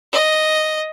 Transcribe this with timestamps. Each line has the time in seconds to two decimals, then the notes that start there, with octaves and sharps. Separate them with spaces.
0.13 D#5